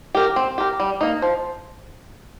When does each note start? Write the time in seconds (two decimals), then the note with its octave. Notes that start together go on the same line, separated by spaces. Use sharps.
0.15 G4 A#4
0.36 C4
0.58 G4 A#4
0.80 G3
1.01 A#3 D#4
1.22 F3